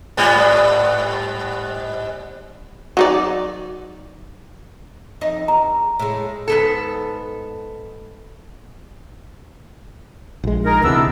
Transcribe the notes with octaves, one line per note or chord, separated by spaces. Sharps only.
G#2 G3 B3
F#3 D#4 D5
F2 D#4 D#5
E2 A#5
A2 G#3
G#2 B3 A4
A#1 G#3
D#4 G#4 A#4
D2 C3 E3 B3 D4 E6